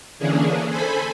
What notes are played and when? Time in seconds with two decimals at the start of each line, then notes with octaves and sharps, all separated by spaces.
0.19 D3 E3 A#3 C#4 D4 G#4
0.68 A4 C5 G#5 B5